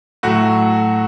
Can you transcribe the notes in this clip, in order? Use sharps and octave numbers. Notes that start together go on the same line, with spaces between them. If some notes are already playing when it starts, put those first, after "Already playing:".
A2 F#3 A3 F#4